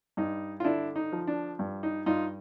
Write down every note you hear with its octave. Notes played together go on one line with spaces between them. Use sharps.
G2 D#4
F4
D3 D4 E4
D#4
F3
D4
G2
D#4
G2 D#4 F4